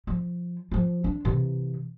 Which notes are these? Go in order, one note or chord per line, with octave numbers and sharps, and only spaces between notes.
F3
F3 F4
D4
C3 E3